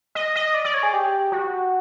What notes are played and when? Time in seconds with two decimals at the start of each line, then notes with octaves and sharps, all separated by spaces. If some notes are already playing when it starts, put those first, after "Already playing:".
0.15 D#5
0.36 D#5
0.54 D5
0.65 D5
0.74 C#5
0.83 G#4
0.93 G4
1.32 F#4